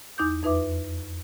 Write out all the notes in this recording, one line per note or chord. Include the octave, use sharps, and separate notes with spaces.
E2 D#4 D6 G6
F2 D#4 B4 E5 D6